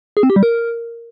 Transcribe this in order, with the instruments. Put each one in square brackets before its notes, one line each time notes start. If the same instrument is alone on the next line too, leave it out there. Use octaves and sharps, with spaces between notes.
[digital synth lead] G#4
C4
G4
G3
A#4